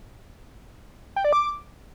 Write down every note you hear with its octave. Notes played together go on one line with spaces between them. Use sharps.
G5
D5
D6